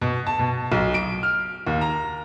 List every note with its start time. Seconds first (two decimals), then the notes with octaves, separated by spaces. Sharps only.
0.01 B2
0.27 A5
0.39 B2
0.72 B1
0.94 D7
1.23 F6
1.67 D#2
1.81 A#5